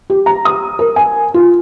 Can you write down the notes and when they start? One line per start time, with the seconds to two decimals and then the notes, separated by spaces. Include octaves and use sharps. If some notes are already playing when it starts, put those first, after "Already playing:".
0.10 G4
0.26 A#5
0.45 D#6
0.79 A#4
0.96 G#5
1.34 F4